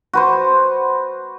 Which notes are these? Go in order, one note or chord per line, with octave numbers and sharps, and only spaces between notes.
F#4 B4 C5